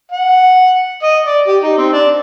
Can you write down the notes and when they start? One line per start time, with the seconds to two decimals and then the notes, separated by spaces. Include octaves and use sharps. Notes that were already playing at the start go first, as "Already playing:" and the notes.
0.12 F#5
1.03 D#5
1.26 D5
1.48 G4
1.63 D#4
1.78 C4
1.93 D4